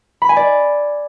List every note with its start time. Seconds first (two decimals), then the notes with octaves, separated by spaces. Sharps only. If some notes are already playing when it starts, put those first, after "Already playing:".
0.22 B5
0.29 G#5
0.37 D5